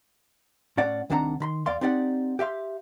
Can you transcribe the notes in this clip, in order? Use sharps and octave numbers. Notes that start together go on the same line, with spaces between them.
A2 C#4 D5 F#5
C2 D#3 C4 D4 F#5 A#5
D#3 B5 C6
E2 D5 F5 C6
C4 D#4 G4 D5 F5 F#5
G4 E5 F5 C6